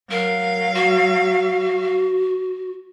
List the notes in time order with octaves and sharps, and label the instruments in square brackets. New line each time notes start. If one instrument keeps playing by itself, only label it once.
[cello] F#3 F5 [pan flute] A#4
[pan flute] F#4